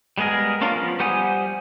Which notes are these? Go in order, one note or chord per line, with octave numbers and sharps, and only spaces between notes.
G3 G#3 B3 G#4 A#4
A#3 C#4 D4 F4 A#4
F3 B3
G3 C5 F#5 G#5 D#6